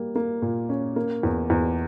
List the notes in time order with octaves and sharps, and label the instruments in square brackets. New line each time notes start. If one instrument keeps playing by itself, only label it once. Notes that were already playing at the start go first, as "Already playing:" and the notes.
Already playing: [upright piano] G3 A#3
A#3
A#2
C#4
A#3
E2
E2